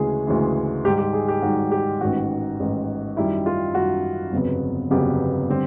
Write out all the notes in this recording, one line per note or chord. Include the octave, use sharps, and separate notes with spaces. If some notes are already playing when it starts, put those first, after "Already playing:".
Already playing: D2 C#3 E3 G#3 G#4
D2 C#3 E3 G#3
G#2 D#3 G3 G4
G4
G#4
G4
G#2 D#3 G3 F#4
G4
A1 G#2 D#3 F#4
A1 G#2 D#3
F#2 D#3 G3 E4
F4
F#2 D#3 G3 F#4
G1 F2 C#3 F#3 B3
G1 F2 C#3 F#3 B3 G4
D3 G3 C4